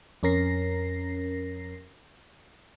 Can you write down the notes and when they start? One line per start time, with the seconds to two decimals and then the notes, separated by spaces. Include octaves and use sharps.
0.23 F2 C#4 A#4 A#6 C7